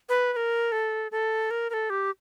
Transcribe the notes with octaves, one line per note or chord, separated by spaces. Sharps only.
B4
B4
A#4
A4
A4
A#4
A#4
A4
G4